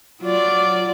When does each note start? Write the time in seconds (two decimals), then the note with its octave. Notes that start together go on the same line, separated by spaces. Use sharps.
0.22 F#3 F4 D5